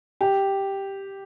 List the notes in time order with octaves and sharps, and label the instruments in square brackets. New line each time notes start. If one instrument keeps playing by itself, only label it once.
[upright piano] G4